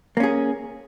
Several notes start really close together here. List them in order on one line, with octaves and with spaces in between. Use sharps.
A#3 C#4 G#4